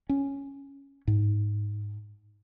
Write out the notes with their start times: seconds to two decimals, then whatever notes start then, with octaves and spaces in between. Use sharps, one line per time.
0.09 C#4
1.07 G#2